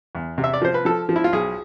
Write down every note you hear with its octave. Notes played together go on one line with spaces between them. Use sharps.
E2
C3
E5
D5
F3 C5
B4
F3 A4
F3
E4
F4
B1 G#4